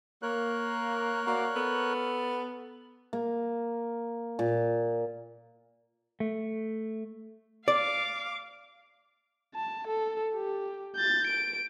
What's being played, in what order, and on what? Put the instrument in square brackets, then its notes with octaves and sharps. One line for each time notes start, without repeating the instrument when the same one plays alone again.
[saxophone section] A#3 [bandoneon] A#4 C#5 F#6
[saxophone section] A#3 F#4 D5
B3 A4
[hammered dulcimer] A#3
A#2
[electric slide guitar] A3
[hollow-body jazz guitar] D5 [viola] F5 D6
[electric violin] A5
A4
G4
G6 A6
D7